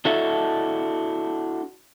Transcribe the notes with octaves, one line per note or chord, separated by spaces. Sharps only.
D4 E4 F#4 A4 D#5 E5